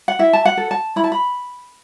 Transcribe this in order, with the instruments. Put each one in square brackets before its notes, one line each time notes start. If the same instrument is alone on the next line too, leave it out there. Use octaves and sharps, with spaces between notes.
[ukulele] F#5
E4 E5
A5
F#5
A4
A5
E4 B5
A5
B5